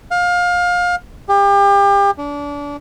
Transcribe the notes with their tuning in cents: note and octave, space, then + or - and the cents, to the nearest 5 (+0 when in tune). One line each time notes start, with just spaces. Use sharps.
F5 +25
G4 +35
D4 -30